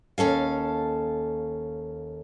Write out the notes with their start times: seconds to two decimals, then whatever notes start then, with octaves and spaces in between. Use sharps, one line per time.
0.18 D#2 C#4 A4 F5